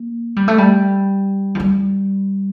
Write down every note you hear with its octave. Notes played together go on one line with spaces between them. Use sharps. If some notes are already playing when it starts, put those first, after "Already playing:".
Already playing: A#3
G3
A3
G3
F3
G3